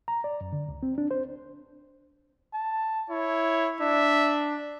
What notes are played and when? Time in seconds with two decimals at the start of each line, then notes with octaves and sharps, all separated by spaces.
0.08 A#5
0.24 D5
0.41 F#2
0.53 D3
0.69 C#2
0.83 C4
0.98 D4
1.11 C5
2.54 A5
3.10 E4 C#5
3.81 D4 E5